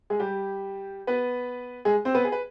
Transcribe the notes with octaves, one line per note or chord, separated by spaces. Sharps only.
G#3 G#4
G3 G4
B3 B4
G#3 G#4
C4 C5
B3 B4
G#4
B4